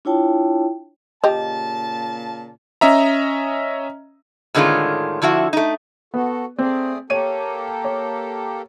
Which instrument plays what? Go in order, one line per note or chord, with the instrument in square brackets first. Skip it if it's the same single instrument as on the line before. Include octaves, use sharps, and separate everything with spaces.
[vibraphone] D4 E4 F4 C#5 G5 A5
[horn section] A#2 C#3 A5 [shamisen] G4 D#5
[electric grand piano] C#4 D#5 E5 A#5
[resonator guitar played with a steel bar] A2 D3 D#3 G#3 C#4 F4
D3 F3 E4 F#4
A3 D#4
[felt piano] B3 [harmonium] F#4 A4
[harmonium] A3 G#4 D5 [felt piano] C4
[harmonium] A#3 G4 A4 [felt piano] C#5 D#7
[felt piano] C#5